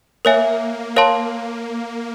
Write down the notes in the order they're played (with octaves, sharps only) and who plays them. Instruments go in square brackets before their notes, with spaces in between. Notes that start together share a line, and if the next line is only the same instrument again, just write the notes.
[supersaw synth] A#3 [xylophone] A#4 C#5 E5 G#5
[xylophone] A#4 C#5 F5 A5 C6